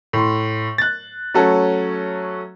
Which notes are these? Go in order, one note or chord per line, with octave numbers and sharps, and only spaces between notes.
A2 C6
F#6 A6
F#3 A3 C#4 F#4 A4